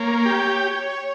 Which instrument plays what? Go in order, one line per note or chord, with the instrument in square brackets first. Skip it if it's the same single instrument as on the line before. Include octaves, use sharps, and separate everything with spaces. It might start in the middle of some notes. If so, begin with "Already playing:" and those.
Already playing: [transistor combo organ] A#3 [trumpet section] C#5
[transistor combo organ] G4